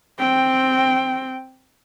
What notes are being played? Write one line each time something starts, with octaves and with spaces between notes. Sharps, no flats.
C4 G5